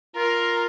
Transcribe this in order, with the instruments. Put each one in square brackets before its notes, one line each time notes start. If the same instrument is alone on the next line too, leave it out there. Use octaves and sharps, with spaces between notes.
[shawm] F4 [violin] A#4